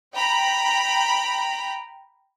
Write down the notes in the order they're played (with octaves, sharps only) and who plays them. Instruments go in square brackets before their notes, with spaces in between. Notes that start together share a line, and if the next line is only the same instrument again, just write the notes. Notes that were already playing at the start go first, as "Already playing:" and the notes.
[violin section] G5 A#5 B5